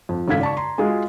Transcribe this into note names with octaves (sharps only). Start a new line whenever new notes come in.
F2
G#1 C#3 A4 F5 G#6 B6
D5 A5 C#6
A#5 C6
G#3 F4 F#4 G#4